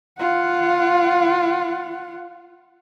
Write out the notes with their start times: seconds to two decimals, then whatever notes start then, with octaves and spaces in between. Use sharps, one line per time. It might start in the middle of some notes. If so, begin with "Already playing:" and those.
0.19 F4 F#5